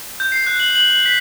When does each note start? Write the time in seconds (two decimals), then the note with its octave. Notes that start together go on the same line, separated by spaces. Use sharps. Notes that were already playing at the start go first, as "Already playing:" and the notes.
0.20 G6
0.32 C7
0.47 F#6
0.60 F#7
0.76 F#7
0.91 F#7
1.06 B6